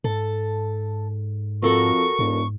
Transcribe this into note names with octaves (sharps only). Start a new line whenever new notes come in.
G#2 A4
F2 F#4 A4 A#4 C#6
E1 G#2